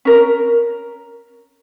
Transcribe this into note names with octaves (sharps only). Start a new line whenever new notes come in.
C#4 A#4